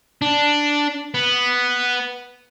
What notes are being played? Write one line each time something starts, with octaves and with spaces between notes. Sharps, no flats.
D4
B3